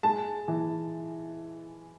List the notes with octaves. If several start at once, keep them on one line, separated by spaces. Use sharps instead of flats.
G#3 A5
E3